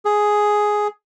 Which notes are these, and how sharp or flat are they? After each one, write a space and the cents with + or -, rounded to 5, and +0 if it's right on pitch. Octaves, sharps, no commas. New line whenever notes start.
G#4 +5